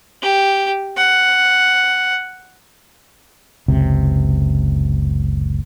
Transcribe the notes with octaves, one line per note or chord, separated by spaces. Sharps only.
G4
F#5
F#1 C#2 C3